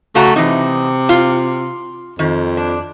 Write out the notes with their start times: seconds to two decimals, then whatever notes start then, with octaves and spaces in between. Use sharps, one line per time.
0.15 C#3 A3 F#4 A#5
0.36 C3 E3 D#4
1.09 F4
2.19 F2 D#3
2.57 D4